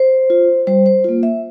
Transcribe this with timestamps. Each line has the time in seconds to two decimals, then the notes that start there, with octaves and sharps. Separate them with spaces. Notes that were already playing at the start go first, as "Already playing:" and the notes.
Already playing: C5
0.30 F4
0.67 G3 C5
0.86 C5
1.04 A#3 F4
1.23 E5